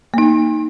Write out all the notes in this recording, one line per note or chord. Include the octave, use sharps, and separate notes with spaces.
A#3 D#4